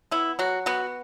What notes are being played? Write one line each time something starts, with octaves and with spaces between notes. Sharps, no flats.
B3 E4
F#3 F#4
B3 F#4